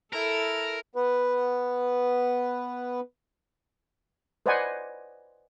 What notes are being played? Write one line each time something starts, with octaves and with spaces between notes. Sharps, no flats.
E4 A4 A#4
B3 B4
B4 C5 D5 D#5 F#5 G#5